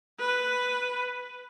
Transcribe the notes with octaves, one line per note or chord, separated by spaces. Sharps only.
B4